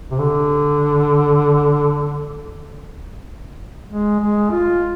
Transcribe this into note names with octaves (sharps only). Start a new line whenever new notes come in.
C3
D3
G#3
G#3
F4